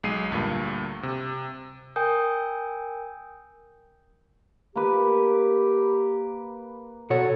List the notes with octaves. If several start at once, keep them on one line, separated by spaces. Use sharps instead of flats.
B1 G#3 C7 D#7
D2 G2 A#2
C3
A#4 G5 G#5 D#6 G6
A#3 G4 B4
B2 F#4 A4 C#5